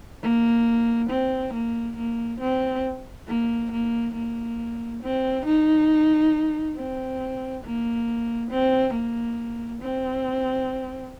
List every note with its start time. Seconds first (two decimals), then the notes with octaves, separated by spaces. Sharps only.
0.23 A#3
1.10 C4
1.54 A#3
1.96 A#3
2.40 C4
3.28 A#3
3.72 A#3
4.14 A#3
5.02 C4
5.46 D#4
6.76 C4
7.64 A#3
8.51 C4
8.94 A#3
9.82 C4